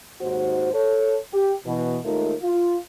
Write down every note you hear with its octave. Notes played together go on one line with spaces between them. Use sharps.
D#2 G#2 F#4 C5
A4 C#5
G4
B2 E3
D#2 G#3 A3 D#4 F4 A#4
F4